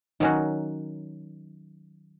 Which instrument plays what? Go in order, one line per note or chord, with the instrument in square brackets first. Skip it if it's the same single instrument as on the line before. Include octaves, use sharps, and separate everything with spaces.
[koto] D#3 F#3 C#4 F#4 [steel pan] D#4